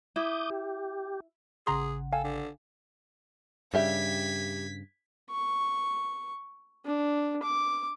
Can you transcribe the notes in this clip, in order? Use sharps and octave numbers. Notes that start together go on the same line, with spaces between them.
E4 D6 D#6 G6
G4
A1 C#3 G#4 F#5 A#5 C6
A4 F5 G5 G#5
D3
G2 C#3 G3 G4 E5 G#6 B6
C#6
D4
D6